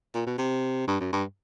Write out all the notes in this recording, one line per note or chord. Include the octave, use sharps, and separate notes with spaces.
A#2
B2
C3
G2
F#2
G2